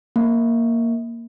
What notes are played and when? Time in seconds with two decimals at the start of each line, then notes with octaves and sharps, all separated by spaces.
0.16 A#3